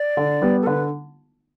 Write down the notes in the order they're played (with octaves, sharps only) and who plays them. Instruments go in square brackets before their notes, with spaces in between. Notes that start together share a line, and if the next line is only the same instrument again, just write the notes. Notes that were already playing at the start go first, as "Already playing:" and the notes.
Already playing: [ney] D5
[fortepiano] D3
G3 B3
[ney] A4
[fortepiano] D3 [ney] B4